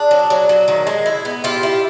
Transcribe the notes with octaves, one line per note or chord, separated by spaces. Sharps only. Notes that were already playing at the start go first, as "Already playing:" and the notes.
Already playing: D4 G#4
F#3
F#3
F#3
D#3
G#3
E4
B3
E4 F4 G4
E4